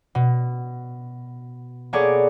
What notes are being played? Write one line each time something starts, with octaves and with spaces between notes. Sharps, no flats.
B2
A#3 B3 G#4 A4 C#5 D5